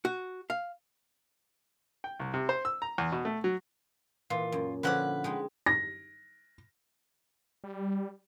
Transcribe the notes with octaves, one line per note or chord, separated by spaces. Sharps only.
F#4
F5
G5
C2
C3
C5
E6
A#5
E2
B2
A3
F#3
A#2 E3 F4
F#2
D3 F3 C#4 B4 F#5 D6
G#3 D#4 G5
A#6
G3